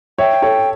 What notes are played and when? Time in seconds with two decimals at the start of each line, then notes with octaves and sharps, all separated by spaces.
0.18 C#5 E5 G5
0.42 A4 C#5